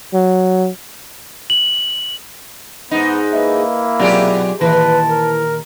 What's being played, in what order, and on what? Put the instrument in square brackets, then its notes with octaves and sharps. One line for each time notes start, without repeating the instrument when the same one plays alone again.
[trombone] F#3
[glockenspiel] F#7
[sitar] G#2 D#4 [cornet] B3
[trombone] A#3 [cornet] E4 [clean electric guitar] B4 D#5 E5
[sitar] B2 G4 G#4 [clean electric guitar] F#3 F4 D5
[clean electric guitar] A#2 D#3 [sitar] E3 [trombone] B4 [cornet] A5
[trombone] A#4